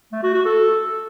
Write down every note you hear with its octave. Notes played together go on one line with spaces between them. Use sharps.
A3
F#4
F#4
A4